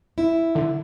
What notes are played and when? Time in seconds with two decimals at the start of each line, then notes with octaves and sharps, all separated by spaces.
0.18 E4
0.55 D3